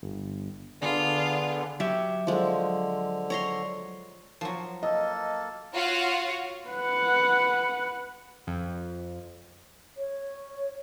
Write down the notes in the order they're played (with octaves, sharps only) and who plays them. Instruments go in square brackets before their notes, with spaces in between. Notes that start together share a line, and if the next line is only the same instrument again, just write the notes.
[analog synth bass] G1
[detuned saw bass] D3 [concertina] B3 G#4 [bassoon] D4 [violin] F4
[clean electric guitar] F#3 E5 [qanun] G4
[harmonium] D3 [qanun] F3 G#3
[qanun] C#5 A#5 C6
[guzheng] F3 F#3
[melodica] A#3 A4 A5 [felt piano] D#5
[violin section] F4 F#4 C#5 F5 F#5
[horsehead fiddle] B4 F#5
[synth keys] F2
[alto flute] C#5